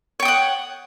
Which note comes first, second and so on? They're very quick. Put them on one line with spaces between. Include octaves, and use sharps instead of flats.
C#5 G5 D#6 F#5